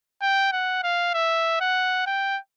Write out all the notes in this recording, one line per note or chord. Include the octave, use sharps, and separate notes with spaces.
G5
F#5
F5
E5
F#5
G5